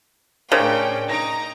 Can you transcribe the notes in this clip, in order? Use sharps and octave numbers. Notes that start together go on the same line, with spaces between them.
A2 C#3 C#4 D4 A#4 C5 G5
D#4 A#5 A#6 D7